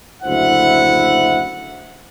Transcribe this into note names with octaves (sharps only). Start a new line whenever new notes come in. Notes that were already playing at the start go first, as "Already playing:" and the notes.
F#1 D2 E4 C5 E5 F#5